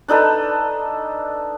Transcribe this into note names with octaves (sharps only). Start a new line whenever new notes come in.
D4 D#4 A4 B4